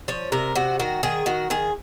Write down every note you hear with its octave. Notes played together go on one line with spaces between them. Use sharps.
F3 C#5
C3 A#4
C3 F#4
D#3 F#4
D#3 G#4
D#3 F#4
D#3 G#4